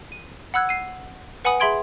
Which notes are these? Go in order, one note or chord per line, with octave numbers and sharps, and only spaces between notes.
D#7
F#5 B5 E6 F#6 G#6
C7 D#7
B4 F#5 G#5 B5 D#6
G#4 E5 B5 C6 G#6 D7